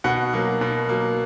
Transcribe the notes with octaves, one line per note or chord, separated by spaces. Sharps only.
B2 F#5
F#3 A#3
B2
F#3 A#3